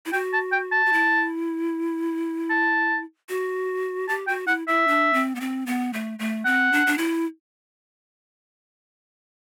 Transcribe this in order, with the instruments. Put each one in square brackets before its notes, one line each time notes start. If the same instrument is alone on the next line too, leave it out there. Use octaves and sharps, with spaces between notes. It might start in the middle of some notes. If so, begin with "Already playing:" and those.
[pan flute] E4
[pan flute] F#4 [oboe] G5
[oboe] A5
G5
A5
[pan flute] F#4
E4
[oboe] A5
[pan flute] F#4
[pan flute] G4 [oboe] A5
[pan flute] F#4 [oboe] G5
[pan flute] E4 [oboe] F#5
[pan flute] E4 [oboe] E5
[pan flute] D4
C4
B3
C4
B3
A3
A3
[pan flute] C4 [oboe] F#5
[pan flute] D4
D4
E4